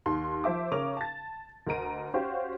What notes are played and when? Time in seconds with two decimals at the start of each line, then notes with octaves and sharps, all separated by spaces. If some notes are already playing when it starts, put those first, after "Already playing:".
0.06 D#2 C6
0.44 F3 C5 E5 D6
0.72 C#3 C#4 A#4 D6 F7
0.97 A5 A6
1.67 D2 A#4 D#5 A#5 D7 D#7
2.14 C#4 F#4 G4 C5 F5